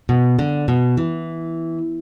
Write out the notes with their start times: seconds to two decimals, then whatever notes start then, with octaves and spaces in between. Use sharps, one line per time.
0.09 B2
0.39 D3
0.68 B2
0.97 E3